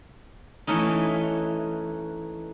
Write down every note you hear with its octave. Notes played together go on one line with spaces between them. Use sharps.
E3 A3 C#4 D#4